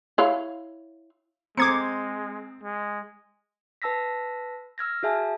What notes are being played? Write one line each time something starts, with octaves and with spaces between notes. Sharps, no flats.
E4 C#5 F5
G#3 C4 A#5 D6 D#6 G#6 C#7
G#3
B4 A5 E6 A#6 B6
E6 F6 G#6 A#6
F#4 G#4 E5 G#5 A5